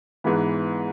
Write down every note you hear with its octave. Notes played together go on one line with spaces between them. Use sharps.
G#2 E3 B3